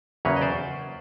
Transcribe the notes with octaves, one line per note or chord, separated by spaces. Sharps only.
E2 C#3 F#3 A#3 B4 C#5
D#5
C5 D5